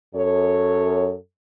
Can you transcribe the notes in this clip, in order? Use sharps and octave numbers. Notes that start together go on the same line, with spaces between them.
F#2 A4 C#5